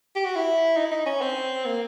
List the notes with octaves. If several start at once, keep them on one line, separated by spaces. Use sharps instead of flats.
G4
F#4
E4
D#4
E4
D#4
C#4
C4
A#3